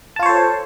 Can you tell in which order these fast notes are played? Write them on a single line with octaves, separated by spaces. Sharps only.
A5 F4 C#5 C5 A4